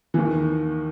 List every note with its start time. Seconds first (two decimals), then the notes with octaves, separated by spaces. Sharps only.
0.14 E3
0.17 D#2 D#3